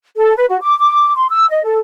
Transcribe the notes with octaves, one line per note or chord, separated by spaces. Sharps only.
A4
B4
F#4
D6
D6
C6
E6
D#5
A4